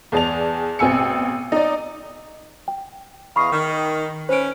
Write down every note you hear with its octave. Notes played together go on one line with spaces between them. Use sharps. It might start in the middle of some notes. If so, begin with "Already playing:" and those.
E2 G#4 D5 A5 F7
A1 B2 C4 G#5 E6 C#7
D#4 D5
G5
E2 D#5 F5 B5 C#6 C7
D#3
C#4 B4 C5 D7